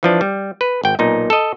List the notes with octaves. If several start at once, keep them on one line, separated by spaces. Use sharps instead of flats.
E3 F3 D4
G3
B4
G#1 G5
B1 A#2 D#4
A4 D#5